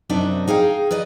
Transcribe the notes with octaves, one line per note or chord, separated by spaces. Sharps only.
F#2 C3 D4 D#4 F#4 E5
D#4 G#4 F5 G5
B4 D5 D#5